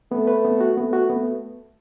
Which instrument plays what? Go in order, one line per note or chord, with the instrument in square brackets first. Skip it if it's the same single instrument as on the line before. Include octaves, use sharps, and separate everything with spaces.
[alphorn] A3 [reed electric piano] B3
[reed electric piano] B4
B3
F#4
[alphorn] A3 [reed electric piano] B3
[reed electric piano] F#4
B3